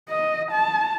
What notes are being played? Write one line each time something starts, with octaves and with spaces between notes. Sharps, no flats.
D#5
A5